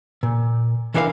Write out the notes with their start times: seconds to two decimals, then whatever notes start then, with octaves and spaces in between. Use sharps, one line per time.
0.23 A#2
0.94 C2 E3 D4 A#4 C#5 F5